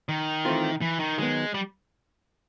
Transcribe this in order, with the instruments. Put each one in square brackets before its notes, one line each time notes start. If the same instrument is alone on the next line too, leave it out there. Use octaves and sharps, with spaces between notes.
[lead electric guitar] D#3
[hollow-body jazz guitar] E3 A3 C4 F4
[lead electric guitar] E3
D#3
[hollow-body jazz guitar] D#3 F#3 B3 [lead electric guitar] G#3
[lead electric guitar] G3